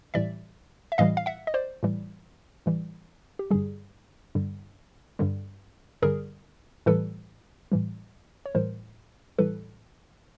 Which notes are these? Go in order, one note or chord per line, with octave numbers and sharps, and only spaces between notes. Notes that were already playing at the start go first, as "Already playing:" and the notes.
A2 E3 G3 D5 E5
E5
A2 E3 G3 D#5 F5
F5
E5 F#5
D#5
C5 D5
A2 E3 G3
A2 E3 G3
G4
G2 D3 G3 G#4
G2 D3 G3
G2 D3 G3
G2 D3 G3 G#4 A#4
A2 E3 G3 A4 B4
A2 E3 G3
C#5
A2 E3 G3 A#4 C5
A2 E3 G3 A4 B4